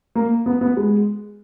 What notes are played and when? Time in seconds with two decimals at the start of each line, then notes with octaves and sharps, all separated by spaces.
0.15 A#3
0.46 B3
0.61 B3
0.77 G#3